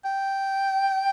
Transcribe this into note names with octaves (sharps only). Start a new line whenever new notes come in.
G5